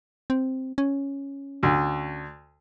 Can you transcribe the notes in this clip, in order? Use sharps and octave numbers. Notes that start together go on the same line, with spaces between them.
C4
C#4
D2